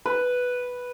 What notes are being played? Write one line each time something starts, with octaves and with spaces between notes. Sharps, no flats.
B4